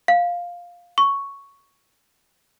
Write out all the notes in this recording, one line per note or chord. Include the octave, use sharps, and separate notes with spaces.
F5
C#6